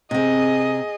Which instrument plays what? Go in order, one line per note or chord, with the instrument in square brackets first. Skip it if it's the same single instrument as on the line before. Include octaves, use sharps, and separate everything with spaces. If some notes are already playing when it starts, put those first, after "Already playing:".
[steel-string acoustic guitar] C3 C4 [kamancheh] G#4 D#5